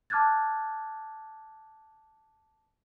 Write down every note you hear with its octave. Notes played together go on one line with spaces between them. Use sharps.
A5 D6 F6 F#6 G#6 A6